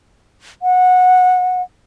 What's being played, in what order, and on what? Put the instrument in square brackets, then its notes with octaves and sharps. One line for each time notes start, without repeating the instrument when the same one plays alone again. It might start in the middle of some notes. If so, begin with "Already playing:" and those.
[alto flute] F#5